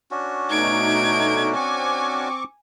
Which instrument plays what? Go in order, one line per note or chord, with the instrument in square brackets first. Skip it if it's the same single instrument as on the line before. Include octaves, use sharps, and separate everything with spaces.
[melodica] C#4 D4 F#4
[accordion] B2 A3 D#4 [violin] G#6 D7
[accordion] C4 C#6 D6 [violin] G#5